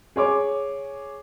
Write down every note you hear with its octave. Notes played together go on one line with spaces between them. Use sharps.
G#4 C#5 D6